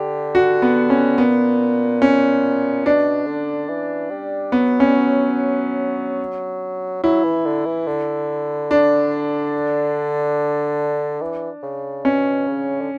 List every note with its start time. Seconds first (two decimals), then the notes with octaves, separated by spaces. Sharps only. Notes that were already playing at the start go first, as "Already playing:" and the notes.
Already playing: D3 G4
0.35 F#4
0.62 B3
0.90 C#4
1.18 A#2 B3
2.02 C#4
2.85 B2 D4
3.26 D3
3.68 E3
4.10 G3
4.52 F#3 B3
4.80 G3 C#4
4.94 F#3
7.03 F#3 E4
7.24 E3
7.45 D3
7.65 E3
7.87 D3
8.71 D4
11.21 E3
11.63 C#3
12.04 B2 C#4
12.47 C#3
12.81 D3